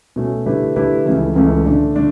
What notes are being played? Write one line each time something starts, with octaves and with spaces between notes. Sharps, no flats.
B2 A3 C#4
D3 A3 E4 G4 B4
D3 A3 E4 G4 B4
C#2 C#3 E3 A3
C#2 C#3 E3 A3
D3 A3 D4
D3 A3 D4